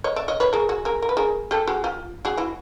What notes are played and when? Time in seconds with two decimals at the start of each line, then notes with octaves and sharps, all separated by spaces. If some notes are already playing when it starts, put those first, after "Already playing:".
0.04 C#5 D#5
0.16 D5 E5
0.28 C#5 D#5
0.40 B4 C#5
0.53 G#4 A#4
0.69 F#4 G#4
0.85 G#4 A#4
1.02 A#4
1.09 B4
1.17 G#4 A#4
1.51 G4 A4
1.68 F#4 G#4
1.84 F4 G4
2.25 F#4 G#4
2.37 E4 F#4